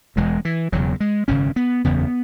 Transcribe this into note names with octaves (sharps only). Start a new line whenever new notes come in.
E1 E2 B2 G#3
E3
E1 E2 C#3 F#3
G#3
G#1 F#2 C#3 C#4
B3
F#1 E2 C#3 B3